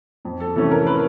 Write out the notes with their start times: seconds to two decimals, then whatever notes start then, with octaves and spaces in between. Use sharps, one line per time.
0.25 F2
0.40 A4
0.56 C3 E3 A3 C#4 A4
0.71 A#4
0.87 B4